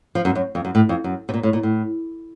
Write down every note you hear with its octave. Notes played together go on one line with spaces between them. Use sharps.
F3
F#2
F#2
F2
F#2
A2
F2
F#2
C3
A#2
A2
A#2
A2